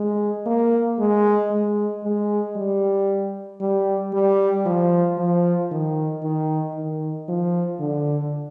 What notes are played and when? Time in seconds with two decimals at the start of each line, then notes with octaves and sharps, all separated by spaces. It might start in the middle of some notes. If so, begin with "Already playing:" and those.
Already playing: G#3
0.46 A#3
0.99 G#3
1.50 G#3
2.04 G#3
2.56 G3
3.60 G3
4.13 G3
4.66 F3
5.18 F3
5.71 D#3
6.23 D#3
6.75 D#3
7.28 F3
7.80 D3